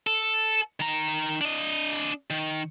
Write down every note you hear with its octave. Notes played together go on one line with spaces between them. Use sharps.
A4
D#3 A#5
D4 D#5
D#3